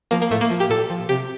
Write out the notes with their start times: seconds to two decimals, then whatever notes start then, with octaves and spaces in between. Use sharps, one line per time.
0.11 F3 A#3
0.22 A#3
0.31 A2 A3
0.41 A#3
0.50 F3
0.60 G4
0.70 A#2 A4
0.90 F3
1.09 C3 G4